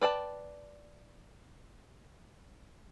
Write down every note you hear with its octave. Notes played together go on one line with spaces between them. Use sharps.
B4 D5 G5 A5